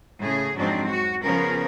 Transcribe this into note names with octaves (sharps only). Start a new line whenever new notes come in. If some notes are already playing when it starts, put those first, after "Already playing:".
A2 C#3 G#4
F2 G#2 F#3 C4 D4
F#4
C#3 F3 B3 C#4 A#4